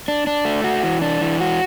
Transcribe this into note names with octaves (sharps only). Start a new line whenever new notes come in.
D4
D4
A3
F#4
E3
D4
E3
F#4